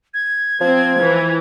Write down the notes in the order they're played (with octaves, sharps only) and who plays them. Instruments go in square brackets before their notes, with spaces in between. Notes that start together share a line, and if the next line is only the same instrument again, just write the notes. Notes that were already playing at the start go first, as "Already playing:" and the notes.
[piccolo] G#6
[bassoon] F3 [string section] C4
[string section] E3